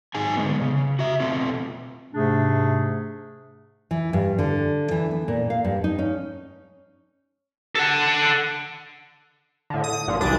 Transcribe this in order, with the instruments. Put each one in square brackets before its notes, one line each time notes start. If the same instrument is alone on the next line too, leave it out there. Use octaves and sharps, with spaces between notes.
[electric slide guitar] G#2 D#3 F#3 D#4 G#4 G#5
D3 G#3 B3
C#3
F#4 E5
B2 A3 C4 F4
[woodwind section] G#2 C3 A3 D4 G#4
[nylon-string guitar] E3
G2
D3
E3
B3
A#2
F5
G2
D#4
C#4
[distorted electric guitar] A4 F#5
[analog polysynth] A2 D3
D#6
A1 G2 A#2 F3
C2 F#2 E3 D4 D#6 D7